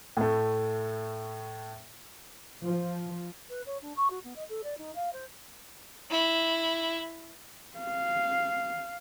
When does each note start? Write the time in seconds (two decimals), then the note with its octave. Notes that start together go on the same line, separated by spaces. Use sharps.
0.17 A2 A3
2.62 F3
3.49 B4
3.66 C#5
3.82 D4
3.96 C#6
4.10 F#4
4.23 B3
4.36 D#5
4.49 A4
4.63 D5
4.77 D#4
4.95 F5
5.12 C5
6.11 E4
7.78 F5